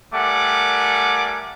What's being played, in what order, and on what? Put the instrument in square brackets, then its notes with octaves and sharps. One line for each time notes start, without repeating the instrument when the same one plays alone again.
[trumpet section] G3 A3 A#4 F#5 G#5 D6